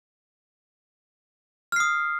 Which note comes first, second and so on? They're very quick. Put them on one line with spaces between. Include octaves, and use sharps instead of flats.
F6 C7 D#6